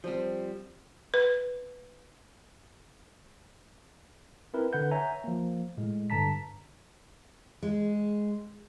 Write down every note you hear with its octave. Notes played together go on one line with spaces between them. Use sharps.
F3 G3 C4
B4
C4 E4 A#4 B4
D3 B4 F#5 G6
C#5 E5 G#5 A#5
F3 A#3
A2 G#3
G2 D3 A5 A#5 B6
G#3